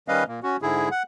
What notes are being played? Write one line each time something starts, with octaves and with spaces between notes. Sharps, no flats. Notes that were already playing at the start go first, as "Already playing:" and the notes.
D#3 G3 C#4 B4 D#5 F5
A#2 A#3
C#4 F#4
G#2 D3 E4 G#4
F#5